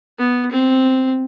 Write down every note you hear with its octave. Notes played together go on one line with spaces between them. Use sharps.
B3
C4